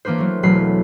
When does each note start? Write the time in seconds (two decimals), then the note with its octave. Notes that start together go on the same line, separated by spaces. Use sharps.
0.05 E3 A#3 D4 B4 C5
0.18 F#3 A3
0.43 E1 F#3 A3 B5 C7